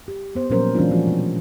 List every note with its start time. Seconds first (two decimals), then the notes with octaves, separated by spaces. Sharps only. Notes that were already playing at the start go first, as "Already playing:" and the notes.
0.08 G4
0.35 B3 C5
0.50 A#2 F3 F#3 C#4 A#4 C5
0.75 E3 G3 G#3 C#4 D4 F4
0.91 E3 F3 F#4
1.07 B2 A3